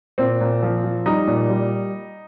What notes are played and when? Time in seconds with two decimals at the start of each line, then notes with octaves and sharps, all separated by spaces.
0.18 A#2 C4
0.41 A#2
0.63 F3
0.84 F3
1.06 G3 D#4
1.27 A#2
1.50 G3